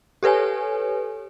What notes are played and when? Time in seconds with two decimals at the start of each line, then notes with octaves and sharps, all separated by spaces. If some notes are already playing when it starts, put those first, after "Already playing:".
0.23 G4 A4 B4 C#5 G#5